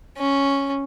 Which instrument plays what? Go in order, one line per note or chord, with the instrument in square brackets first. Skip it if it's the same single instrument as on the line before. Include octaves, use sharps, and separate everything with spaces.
[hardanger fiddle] C#4